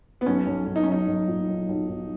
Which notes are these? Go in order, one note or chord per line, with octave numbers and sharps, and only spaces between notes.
B3
B1 C#4
B1
B1
D#4
C#4
B1 D#4
B1
A#2
B1
B1
B1